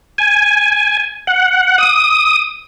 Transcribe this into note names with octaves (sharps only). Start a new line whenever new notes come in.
G#5
F#5
D#6